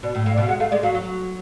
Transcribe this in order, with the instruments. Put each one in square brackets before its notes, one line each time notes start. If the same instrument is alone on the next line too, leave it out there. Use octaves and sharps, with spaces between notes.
[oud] B2 [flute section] D5
[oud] A2
[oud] A2 [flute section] F5
[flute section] D5
[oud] B2
[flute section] F5
[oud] G#3 [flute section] F#5
[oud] A3 [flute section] F5
[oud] G#3 [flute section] D5
[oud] F#3 [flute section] F5
[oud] F#3